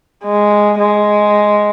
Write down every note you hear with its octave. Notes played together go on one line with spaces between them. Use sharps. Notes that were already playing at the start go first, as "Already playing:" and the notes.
G#3
G#3